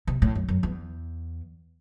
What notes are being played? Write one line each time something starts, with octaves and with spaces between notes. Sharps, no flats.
C3
A2
F#2
F#2
E2